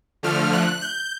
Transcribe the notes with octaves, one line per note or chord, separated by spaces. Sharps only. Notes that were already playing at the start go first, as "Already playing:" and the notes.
D3 F3 A3 F6
F#6
G6